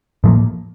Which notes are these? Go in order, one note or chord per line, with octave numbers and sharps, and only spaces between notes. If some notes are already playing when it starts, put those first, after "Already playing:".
A2 F3 A#3